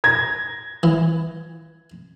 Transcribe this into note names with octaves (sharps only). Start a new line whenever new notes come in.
G#6 A#6
E3